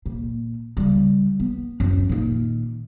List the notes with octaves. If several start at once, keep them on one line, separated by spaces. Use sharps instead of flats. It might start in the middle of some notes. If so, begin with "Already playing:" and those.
A#2
C#3 G3
B3
D1 F#2
A#2 D#3